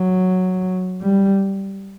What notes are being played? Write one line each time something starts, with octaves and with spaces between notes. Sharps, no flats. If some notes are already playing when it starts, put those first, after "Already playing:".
Already playing: F#3
G3